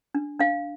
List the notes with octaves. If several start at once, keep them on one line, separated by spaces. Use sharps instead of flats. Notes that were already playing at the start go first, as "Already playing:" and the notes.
D4
D4 F5